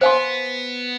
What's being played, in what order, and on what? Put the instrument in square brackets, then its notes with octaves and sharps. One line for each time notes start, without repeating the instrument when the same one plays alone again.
[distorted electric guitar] B3 [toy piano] C5 F5 G#5 C6